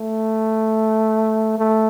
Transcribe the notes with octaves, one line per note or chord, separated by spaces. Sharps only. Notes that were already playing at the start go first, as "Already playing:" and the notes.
Already playing: A3
A3